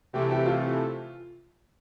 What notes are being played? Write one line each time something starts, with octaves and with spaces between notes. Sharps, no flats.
C3 E3 A3 G4
G4
F4